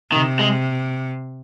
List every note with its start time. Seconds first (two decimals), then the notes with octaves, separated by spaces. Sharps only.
0.12 C3 D#3
0.39 G#3